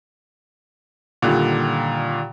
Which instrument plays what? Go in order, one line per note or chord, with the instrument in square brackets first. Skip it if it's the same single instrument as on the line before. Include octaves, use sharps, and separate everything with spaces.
[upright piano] A#2 D3 D#3 G3